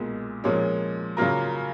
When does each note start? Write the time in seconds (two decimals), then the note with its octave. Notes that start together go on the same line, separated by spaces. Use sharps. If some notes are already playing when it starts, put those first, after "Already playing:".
Already playing: B1 A#2 G#3
0.44 A#2 F3 G#3 C#4
1.17 C#3 F#3 A#3 F4 A#4